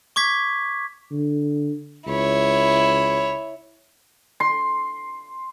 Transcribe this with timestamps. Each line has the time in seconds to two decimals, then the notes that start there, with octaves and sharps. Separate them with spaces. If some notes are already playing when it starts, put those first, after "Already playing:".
0.16 C#6 D6 G#6 B6
1.11 D3
2.07 C#2 E4 C#5
4.40 C6